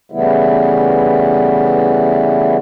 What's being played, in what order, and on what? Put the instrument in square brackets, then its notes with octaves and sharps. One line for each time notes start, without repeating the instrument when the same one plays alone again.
[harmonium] C#3 E3 G3 A3 B3 E4